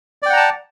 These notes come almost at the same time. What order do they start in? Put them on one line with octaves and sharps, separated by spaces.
D5 G5 F#5 A#5 A5